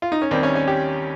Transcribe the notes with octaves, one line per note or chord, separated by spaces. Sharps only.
F4
D#4
C#4
D#2 D#3 G3 C4
C#4
C#4
G4